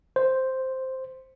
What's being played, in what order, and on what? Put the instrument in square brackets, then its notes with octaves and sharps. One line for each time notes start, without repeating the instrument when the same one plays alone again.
[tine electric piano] C5